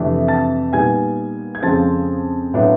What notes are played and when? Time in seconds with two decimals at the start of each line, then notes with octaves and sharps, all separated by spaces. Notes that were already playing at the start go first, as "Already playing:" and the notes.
Already playing: F2 C3 E3 A3 D4
0.28 A5 A6
0.73 A#2 G3 B3 D#4 G#5 G#6
1.55 G#6
1.62 F2 C#3 F3 G#3 C4 A5 A6
2.54 A2 F#3 B3 D4 F4